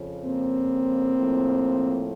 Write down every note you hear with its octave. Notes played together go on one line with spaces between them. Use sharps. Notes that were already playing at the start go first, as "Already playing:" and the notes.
Already playing: F2 C#3 F3
A#3 C4
A2 F3